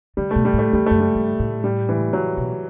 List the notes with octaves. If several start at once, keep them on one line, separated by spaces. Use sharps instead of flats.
D3 G3
A3
B2
G3
A2
A3
E2 G3
F#2 A3
G3
G2
A2
G3
E3
F#3
B2